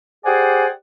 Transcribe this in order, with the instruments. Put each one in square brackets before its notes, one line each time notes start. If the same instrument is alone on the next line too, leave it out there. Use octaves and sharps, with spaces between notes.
[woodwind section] G4 G#4 C5 D5 F#5 G#5